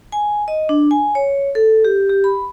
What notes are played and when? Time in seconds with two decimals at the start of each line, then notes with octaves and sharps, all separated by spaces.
0.12 G#5
0.48 D#5
0.69 D4
0.91 G#5
1.15 C#5
1.55 A4
1.85 G4
2.09 G4
2.24 B5